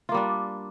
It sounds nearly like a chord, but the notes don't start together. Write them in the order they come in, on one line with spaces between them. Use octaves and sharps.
F4 A#3 G3 D4